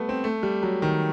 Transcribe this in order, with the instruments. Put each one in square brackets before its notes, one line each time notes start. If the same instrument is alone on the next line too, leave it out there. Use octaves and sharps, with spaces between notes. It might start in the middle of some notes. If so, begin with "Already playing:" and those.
Already playing: [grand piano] G3 A3 B3
C4
A3
G3
F#3
D#3